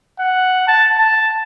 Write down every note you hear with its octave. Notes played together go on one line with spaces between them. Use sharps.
F#5
A5
A5